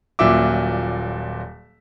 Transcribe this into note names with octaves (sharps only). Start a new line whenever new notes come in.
D#1 A#2 F#3 E5 D6